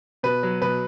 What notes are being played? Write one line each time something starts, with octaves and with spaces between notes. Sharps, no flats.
B2 B4
F#3
B2 B4